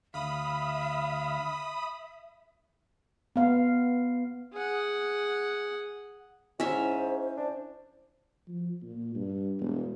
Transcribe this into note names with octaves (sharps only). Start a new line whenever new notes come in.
D2 E5 F5 B5 D#6
B3 F5
G#4 F#5
G#2 C#4 E4 C5 E5
D4
F3
A#2
G2
E1